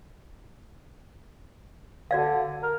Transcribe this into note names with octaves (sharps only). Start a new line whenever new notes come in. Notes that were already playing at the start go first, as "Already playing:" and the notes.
D3 F#4 D5 F5
A#4